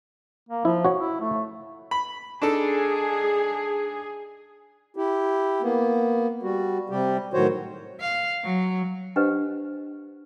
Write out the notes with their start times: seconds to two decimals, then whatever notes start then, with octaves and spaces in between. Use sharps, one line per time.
0.49 A#3
0.65 F3 E4
0.85 F#4 C#5
0.98 E4
1.20 A3
1.91 B5
2.42 D4 D#4 G#4 A4
4.96 E4 G4
5.62 A#3 B3
6.43 G3 F#4
6.89 C3 G3 G4
7.34 A2 D#3 F#3 F#4 C5 C#5
8.00 F5
8.43 F#3
9.16 D4 G4 B4 C5 D#5 F#5